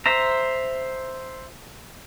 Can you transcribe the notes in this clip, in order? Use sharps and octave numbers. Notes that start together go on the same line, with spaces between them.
C5 E5 A#5